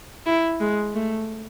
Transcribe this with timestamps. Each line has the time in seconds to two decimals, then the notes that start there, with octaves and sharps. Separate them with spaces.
0.26 E4
0.60 G#3
0.95 A3